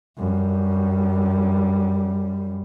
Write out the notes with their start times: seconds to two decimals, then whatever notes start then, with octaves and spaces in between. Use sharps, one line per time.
0.18 F#2 G3